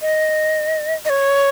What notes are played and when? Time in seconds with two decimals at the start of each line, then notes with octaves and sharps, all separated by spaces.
0.02 D#5
1.05 D#5
1.10 C#5